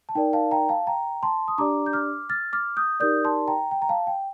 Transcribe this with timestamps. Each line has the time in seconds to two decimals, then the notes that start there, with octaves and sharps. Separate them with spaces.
0.09 A5
0.15 D#4 A#4 D5 G5
0.33 F5 A5
0.51 G5 A#5
0.69 F5 A5
0.87 G5 A#5
1.23 A5 C6
1.48 D#6
1.58 D4 G4 D5 A#5 D6
1.86 G6
1.93 D6 F6
2.30 F6 A6
2.53 D6 F6
2.77 D#6 G6
3.00 D#4 G4 A#4 D5 D#6 G6
3.25 A5 C6
3.47 G5 A#5
3.71 G5
3.82 A#5
3.89 F5 A5
4.07 G5